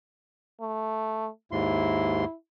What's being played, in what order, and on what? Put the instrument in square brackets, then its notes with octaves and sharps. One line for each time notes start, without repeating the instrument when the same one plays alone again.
[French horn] A3
[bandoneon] D#2 G#2 C6 [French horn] E4